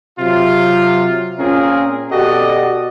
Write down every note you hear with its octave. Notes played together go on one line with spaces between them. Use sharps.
C3 F#3 F4
A#2 C4 C#4 F4 G#4 A#4
B2 F#4 G4 A4 D5 D#5